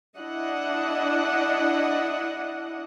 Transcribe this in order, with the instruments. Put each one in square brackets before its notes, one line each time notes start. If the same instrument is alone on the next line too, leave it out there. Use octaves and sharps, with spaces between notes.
[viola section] D4 E4 D#5 F#5